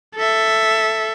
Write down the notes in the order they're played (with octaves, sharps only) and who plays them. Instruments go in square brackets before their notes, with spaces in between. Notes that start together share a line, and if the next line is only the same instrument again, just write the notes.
[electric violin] A4 E5